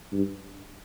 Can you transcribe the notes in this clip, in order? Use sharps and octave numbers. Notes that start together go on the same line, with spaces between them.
G2